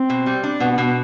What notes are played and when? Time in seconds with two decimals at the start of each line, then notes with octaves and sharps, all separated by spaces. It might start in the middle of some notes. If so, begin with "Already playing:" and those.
Already playing: C4
0.10 B2
0.26 G3
0.44 D4
0.60 B2 B3
0.71 B3
0.78 B2
0.83 B3